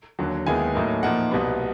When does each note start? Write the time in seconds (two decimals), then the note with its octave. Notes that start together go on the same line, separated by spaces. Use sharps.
0.19 D#2 D3 F#3
0.47 D#2 D#3 G#3 B3 E4 G#5
0.75 A2 F#3 A#3 D#4
1.03 A#2 F3 A#3 D#4 F#5
1.31 C2 B2 G3 B3